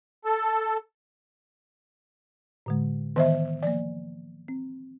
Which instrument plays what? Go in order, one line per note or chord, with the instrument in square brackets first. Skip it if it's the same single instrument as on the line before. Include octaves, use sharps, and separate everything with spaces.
[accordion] A4
[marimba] A2 D3 G#3
[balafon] D#3 C5 E5 [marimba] E3 B3 D#5
[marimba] F3 A#3 [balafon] D5
[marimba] C4